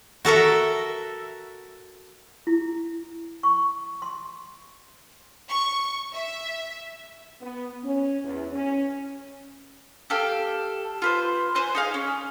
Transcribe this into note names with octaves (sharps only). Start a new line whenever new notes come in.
F#4 A4 A#4 E5
E4
C#6
C6
C#6
E5
B3
C#4
E2
C#4
G4 A4 F5 G5
F4 B4 C5
B4 C5 G#5 F#6
D#4 G#4 F5
C#4